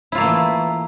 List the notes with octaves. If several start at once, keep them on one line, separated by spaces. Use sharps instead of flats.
E3 A3 A#3 E4 F4